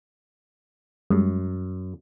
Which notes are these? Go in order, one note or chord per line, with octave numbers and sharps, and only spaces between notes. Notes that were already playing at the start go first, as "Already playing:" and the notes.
F#2 G3 G#3